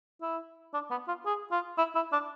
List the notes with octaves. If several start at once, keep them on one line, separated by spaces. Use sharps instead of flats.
E4
D4
B3
F4
G#4
F4
E4
E4
D4